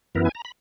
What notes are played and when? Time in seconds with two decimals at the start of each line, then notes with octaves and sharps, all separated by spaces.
0.15 F#2 E3 B3 E4 A#4
0.25 G#5
0.35 A#5
0.45 B5